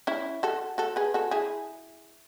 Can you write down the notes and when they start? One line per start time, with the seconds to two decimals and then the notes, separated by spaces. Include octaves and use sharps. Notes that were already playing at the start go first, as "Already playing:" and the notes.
0.07 C#4 E4
0.43 F#4 A4
0.78 F#4 A4
0.96 G#4 B4
1.14 F#4 A4
1.31 E4 G#4